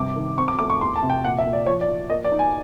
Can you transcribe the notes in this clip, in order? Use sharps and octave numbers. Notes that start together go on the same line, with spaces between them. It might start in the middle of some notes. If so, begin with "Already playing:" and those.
Already playing: G2 C3 D6
D#3
C4 C#6
D6
A3 D6
C#6
E2 C6
A5
C3
G5
A#2 F#5
E5
A#2
D5
F3 C#5
D5
F3
A#3 D#5
D5
D#4
G#5